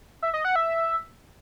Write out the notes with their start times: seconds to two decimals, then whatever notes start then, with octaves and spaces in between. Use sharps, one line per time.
0.22 E5
0.34 D#5
0.45 F#5
0.56 E5